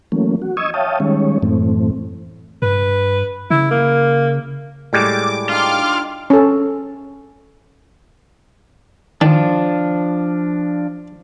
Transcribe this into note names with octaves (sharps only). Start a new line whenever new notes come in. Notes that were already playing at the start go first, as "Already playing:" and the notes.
E3 F#3 A3 A#3 C#4
F#4
D#5 C#6 D#6 E6 G#6
C#5 E5 F5 G5 A5 D#6
D#3 G3 G#3 C#4 C#5
F#2 A2 E3 A3 C4
G2 B4
C#3 E4
A#3
A2 G3 G#3 D6
D4 D#4 F4 G4 D6 F6
C#4 A4
D#3 F3 D4